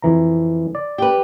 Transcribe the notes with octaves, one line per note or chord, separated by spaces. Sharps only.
F2 E3 A#5
D5
G4 B4